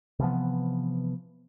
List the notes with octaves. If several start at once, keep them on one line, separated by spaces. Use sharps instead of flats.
C3 E3 F3 B3